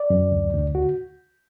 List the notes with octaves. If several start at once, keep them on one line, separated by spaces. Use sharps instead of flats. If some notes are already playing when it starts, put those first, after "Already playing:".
Already playing: D5
F#2
D2
D2
F#4